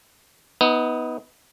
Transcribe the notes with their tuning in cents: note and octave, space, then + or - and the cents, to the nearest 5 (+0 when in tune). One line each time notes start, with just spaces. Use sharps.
B3 +0 D#4 +30